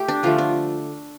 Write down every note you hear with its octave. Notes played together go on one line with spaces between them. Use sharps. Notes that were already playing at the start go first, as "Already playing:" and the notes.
Already playing: A3 G4
D4
D3 F3 A3 F4
D4